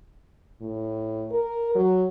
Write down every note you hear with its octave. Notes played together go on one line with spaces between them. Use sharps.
A2
A#4
F#3